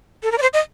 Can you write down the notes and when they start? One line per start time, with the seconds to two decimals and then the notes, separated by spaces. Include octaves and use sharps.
0.23 A4
0.32 A#4
0.38 D5
0.42 C5
0.53 D#5